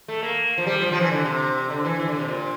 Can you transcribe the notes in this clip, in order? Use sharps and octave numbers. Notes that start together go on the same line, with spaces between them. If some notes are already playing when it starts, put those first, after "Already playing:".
A3
A#3
F3
G3
F3
F3
E3
D3
C3
D3
E3
E3
D3
C3
A#2